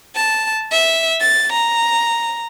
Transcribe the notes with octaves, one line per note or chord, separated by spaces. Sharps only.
A5
E5
A6
A#5